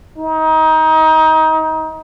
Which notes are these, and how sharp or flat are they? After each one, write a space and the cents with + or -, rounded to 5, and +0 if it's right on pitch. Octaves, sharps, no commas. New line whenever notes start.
D#4 +25